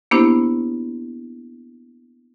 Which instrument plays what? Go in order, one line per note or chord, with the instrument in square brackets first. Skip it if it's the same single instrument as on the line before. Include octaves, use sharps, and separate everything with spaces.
[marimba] A#3 B3 D4 E4 G4 C5